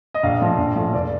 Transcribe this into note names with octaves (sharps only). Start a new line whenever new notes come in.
D#5
A#1 F5
A2 F3
A#1
A2 F3
F1 D5